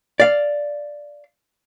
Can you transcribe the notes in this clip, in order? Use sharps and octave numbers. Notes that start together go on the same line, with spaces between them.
D5 F5